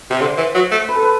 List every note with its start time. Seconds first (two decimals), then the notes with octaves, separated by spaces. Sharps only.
0.11 C3
0.21 D3 C5
0.37 E3
0.55 F#3
0.72 A3
0.89 B4
0.95 A4
1.02 B4